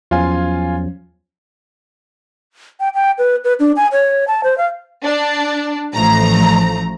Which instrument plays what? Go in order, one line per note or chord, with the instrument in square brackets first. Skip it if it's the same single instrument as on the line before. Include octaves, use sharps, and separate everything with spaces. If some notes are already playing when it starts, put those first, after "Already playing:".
[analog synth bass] E2 [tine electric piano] F3 F#3 C#4 [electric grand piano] F4 F5 G#5
[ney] G5
G5
B4
B4
D4
G#5
C#5
A5
C5
F5
[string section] D4
A1 F3 A3 A#5